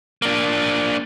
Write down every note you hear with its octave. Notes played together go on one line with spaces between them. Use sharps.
A#3 D4